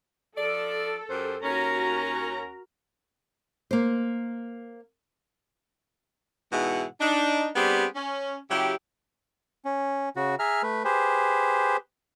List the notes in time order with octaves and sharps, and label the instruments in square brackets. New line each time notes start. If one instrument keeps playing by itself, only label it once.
[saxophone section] F3 D5 [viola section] A4
[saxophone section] F#2 G4 C5
[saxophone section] D#2 C#4 [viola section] F#4 A#4 A#5
[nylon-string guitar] A#3 C5
[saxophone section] G#2 B2 E3 E4 G#4 F#5
D4 D#4
G3 B3 C4 D4 G4 G#4
C#4
C#3 F#3 E4 G4
[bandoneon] C#4
C#3 F#4
G#4 E5 A#5 F6
A3 B4
G4 G#4 B4 C5